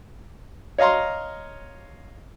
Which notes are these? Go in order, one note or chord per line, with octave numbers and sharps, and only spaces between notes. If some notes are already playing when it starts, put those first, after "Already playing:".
C#5 D#5 F5 A#5 C6